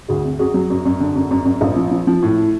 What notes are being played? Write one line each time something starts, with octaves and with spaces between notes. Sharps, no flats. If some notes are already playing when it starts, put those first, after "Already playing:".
D2 F#4 G#4
C3
F#2 F#4 G#4
F#3
F#2
F#2
D3
F#2
F#2
F#2
A#1
F3
F3
F3
A2